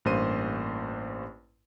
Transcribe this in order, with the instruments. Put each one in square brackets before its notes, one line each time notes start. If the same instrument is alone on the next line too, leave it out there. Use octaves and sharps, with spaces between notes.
[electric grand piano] A1 G2 A#3 C5 C6 D#7